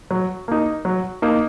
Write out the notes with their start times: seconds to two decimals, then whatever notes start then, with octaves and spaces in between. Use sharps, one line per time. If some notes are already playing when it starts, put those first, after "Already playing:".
0.11 F#3
0.48 A#3 D#4
0.85 F#3
1.22 A#3 D#4